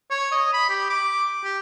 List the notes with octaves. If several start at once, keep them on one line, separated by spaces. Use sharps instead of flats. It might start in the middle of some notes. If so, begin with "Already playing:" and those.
C#5
D#5
B5
G4
D6
G4